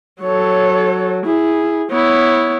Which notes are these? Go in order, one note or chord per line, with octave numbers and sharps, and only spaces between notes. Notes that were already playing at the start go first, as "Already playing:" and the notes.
F#3 A4 C#5
E4 G#4
B3 E4 C#5